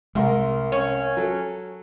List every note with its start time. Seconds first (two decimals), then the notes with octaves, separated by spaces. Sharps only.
0.15 C2 G#3 A#4 E5 C6
0.72 C#4
1.17 F#3 A4